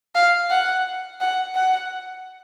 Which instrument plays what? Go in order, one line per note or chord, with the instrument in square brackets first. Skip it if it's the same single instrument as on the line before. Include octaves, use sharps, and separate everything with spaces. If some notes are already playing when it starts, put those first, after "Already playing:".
[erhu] F5
F#5
F#5
F#5